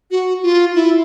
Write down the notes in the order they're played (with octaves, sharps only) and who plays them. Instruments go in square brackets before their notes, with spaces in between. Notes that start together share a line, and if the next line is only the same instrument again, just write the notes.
[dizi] F#4
F4
E4